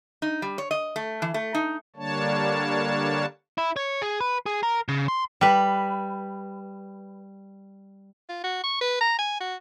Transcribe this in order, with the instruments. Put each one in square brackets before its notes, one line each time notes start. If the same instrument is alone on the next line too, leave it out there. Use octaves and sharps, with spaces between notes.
[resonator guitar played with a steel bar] D#4
G3
C#5
D#5
A3
E3
A3
D#4
[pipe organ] D3 G3 A#3 D4 C#5 A5
[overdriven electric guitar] E4
C#5
G#4
B4
G#4
A#4
C#3
C6
[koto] G3 B4
[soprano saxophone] F4
F#4
C#6
B4
A#5
G#5
F#4